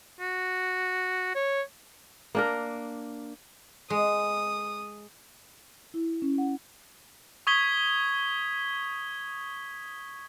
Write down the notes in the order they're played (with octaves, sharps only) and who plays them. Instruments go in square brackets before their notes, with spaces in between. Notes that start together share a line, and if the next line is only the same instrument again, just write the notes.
[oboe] F#4
C#5
[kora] A#3 D4 A#4
[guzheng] G#3 [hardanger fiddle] D#6
[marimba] E4
C#4
F#5
[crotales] C#6 D#6 G#6 B6 G7